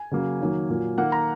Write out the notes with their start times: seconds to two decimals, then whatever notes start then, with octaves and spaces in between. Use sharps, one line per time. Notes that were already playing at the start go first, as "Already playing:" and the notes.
Already playing: G#5
0.11 C#3 F#3 A#3
0.40 D#3 F#3 A#3
0.69 A#2 F#3 A#3
0.98 D#3 A#3 F#5
1.12 A#5